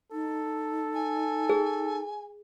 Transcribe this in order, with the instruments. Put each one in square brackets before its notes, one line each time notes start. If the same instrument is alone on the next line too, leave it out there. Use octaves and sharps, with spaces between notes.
[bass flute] D#4 [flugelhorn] A4
[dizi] G#5
[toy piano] G#4